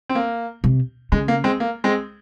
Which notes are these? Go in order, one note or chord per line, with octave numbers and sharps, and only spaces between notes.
C4
A#3
C3
C#3 G#3
A#3
G#3 C4
A#3
G#3 C4